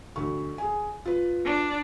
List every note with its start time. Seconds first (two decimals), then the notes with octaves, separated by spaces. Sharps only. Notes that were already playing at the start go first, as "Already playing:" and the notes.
0.16 D2 F#4 C#6
0.58 G#4 G#5
1.05 F4 B4
1.45 D4